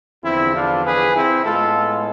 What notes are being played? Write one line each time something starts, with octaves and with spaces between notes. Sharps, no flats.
E2 D3 F3 C4 E4
D4 F4
G#4 B4
C4 E4
A2 G#3 B3 F4 A4